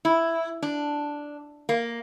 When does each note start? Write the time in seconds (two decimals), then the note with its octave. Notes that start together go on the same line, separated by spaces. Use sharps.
0.05 E4
0.62 D4
1.69 A#3